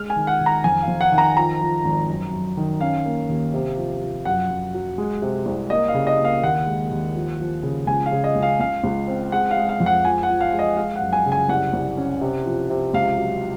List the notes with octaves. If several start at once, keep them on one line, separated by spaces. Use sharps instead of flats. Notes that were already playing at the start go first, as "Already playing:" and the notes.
Already playing: G#3 F6
G#5
D#3
F#5
D#3
A#5
F2 G#5
F5
F2
F#5
D#3
A#5
F3 A#5
F3
G#1
F#2
F#2
D#3
C#4 F5
A#3
D#2
C3
F3
F3
F#2 F#5
F#2
F#3
G#3
C3
C2
A#3 D#5
F5
C#3
D#5
A#3
F5
D#2 F#5
G#3
D#2
F3
F3
C#3
C#2 G#5
F5
C#3
D#5
C#2
F5
C#2 F5
C#2
C4
G#3 F#5
F5
G#3
F5
F2
F#5
F3 G#5
F#5
F3
F5
G#3
D#5
G#3 F5
F#5
F#2
G#5
C#3
G#5
C2 F#5
C2
C#4
C3
F3
C3
C#2 F5
F#3